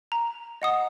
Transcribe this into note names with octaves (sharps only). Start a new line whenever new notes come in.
A#5
D#5 F#5 D#6